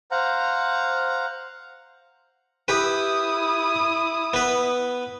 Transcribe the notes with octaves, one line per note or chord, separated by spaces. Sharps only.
C5 F5 F#5 A#5
E4 G4 B4 D#6
B3 B4